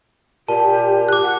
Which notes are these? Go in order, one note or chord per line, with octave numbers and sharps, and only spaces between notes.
A#2 G4 A5
D6 F#6
F#5